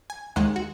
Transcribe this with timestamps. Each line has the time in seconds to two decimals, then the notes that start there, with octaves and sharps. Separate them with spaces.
0.10 G#5
0.36 D#2 D#3 G#3 F#5
0.56 F#4